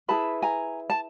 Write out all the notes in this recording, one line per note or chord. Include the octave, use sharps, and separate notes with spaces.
E4 G#4 B4 A5 B5
G#5 A#5
A5